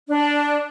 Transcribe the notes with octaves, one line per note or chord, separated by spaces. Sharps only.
D4